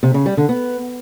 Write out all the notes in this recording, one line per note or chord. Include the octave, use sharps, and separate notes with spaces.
C3
C#3
G3
D3
B3